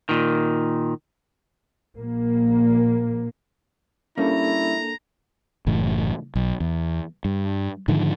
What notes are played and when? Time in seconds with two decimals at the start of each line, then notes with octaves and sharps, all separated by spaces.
0.09 A#2 D#3
1.95 A#1 A#3
4.18 G3 A#3 C#4 D4 E4 A4 A#5
5.67 F#1 A2 E3
6.36 B1
6.60 E2
7.25 G2
7.88 G#2 D3 D#3 F3